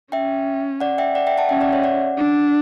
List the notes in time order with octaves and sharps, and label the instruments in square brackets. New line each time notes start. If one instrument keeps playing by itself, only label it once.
[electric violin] C#4 [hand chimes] E5 G5
[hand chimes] D5 F#5
E5 G5
D5 F#5
E5 G5
F#5 A5
[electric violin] C#4 [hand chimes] E5 G5
[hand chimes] D5 F#5
C#5 E5
D5 F#5
[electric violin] D4